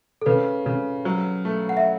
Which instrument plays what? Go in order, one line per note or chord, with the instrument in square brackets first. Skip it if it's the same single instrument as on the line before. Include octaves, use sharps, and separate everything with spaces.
[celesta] A4
[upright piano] C#3 [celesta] B4
[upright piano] C#3
F#3
A3
[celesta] F#5
E5